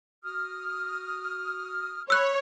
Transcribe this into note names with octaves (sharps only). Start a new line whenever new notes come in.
F#4 D#6 F6
C#5 B5 E6 F#6